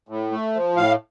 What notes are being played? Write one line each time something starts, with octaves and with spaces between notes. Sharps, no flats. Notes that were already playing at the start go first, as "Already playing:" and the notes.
A2
A3
F3
A2 F5